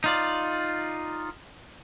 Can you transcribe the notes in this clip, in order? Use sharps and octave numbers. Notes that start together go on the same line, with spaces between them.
D#4 F4 D5